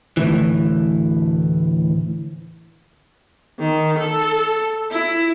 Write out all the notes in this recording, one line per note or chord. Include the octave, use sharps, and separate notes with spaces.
D2 A2 E3
D#3
A4
E4